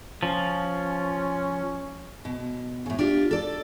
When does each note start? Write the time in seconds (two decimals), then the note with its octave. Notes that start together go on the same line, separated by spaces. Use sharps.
0.23 F3 C#4
2.25 B2
2.86 A2 C#3
2.99 D4 F4 G4
3.31 A4 D5